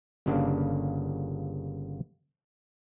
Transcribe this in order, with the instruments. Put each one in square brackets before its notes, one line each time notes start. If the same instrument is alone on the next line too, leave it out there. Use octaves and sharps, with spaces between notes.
[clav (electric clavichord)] G1 C#3 A#3 D4